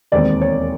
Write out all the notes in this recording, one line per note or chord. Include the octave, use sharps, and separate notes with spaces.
E1 D#2 D#3 G#3 C4 D5
C#5